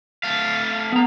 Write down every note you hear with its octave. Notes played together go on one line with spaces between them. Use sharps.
A3 F5
B3 A#5